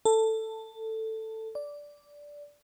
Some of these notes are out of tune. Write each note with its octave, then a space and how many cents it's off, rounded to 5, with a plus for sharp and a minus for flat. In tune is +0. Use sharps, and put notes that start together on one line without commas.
A4 +10
D5 -10